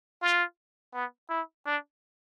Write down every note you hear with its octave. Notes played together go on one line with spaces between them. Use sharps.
F4
B3
E4
D4